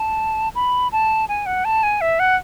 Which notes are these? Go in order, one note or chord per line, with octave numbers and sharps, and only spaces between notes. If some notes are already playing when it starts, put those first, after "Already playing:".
Already playing: A5
B5
A5
G#5
F#5
A5
G#5
E5
F#5